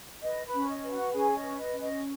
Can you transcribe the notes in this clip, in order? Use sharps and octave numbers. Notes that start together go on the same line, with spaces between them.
B4 D#5
B4 B5
C#4
D#5
B4
F#4 F#5
C#4 G#4 G#5
D#5
B4
D#5
C#4
D#5